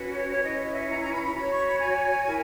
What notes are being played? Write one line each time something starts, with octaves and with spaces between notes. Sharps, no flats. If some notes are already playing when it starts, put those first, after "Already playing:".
Already playing: C#4 F#4 B4
C#5
C#5
C#4 E4 B4 D#5
E5
A#5
A#5
B5
B5
F#4 C#5 B5
C#6
B5
G#5
E4 A#4